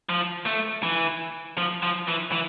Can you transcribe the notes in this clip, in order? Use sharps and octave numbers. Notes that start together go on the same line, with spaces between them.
F3
A3
E3
F3
F3
E3
E3